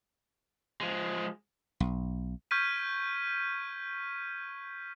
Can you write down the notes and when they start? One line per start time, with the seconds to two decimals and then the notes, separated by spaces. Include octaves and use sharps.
0.81 F3 G#3
1.80 B1
2.51 C#6 F6 G6 G#6 B6 D#7